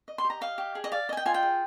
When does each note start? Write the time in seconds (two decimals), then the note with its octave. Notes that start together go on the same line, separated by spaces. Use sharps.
0.08 D#5
0.18 C6
0.24 G4
0.30 A#5
0.41 D#5 F5
0.58 G4
0.75 G#4
0.84 D#5
0.92 D5 F5
1.09 D#5 G#5
1.17 G5
1.26 F4 G#5
1.34 G5
1.43 G#4